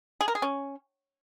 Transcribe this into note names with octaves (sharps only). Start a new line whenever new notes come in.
G#4
A#4
G#4
C#4